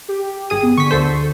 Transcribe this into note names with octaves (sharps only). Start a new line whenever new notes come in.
G4
G1 G#4 D#6
B3
D3 C#6 B6
D2 A4 C5